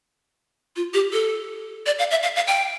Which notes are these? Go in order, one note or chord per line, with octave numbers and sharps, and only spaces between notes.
F4
G4
A4
D5
F5
E5
F5
F5
G5